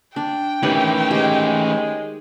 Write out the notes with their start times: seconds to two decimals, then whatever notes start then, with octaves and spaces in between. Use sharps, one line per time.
0.16 D4 G5
0.63 D#3 E3 A3 C#4 G4 B4 G#5
1.11 G#3 G4 C5